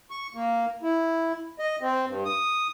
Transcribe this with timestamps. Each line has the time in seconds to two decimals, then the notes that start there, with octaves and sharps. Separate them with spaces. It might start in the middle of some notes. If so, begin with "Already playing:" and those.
0.11 C#6
0.35 A#3
0.83 E4
1.59 D#5
1.81 C4
2.07 G2
2.25 D#6